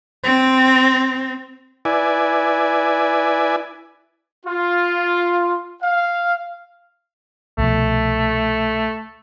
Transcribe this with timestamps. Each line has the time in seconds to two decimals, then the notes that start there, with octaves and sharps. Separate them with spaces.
0.24 C4
1.85 E4 B4 D5 G#5
4.44 F4
5.82 F5
7.58 C2 B2 F3 A3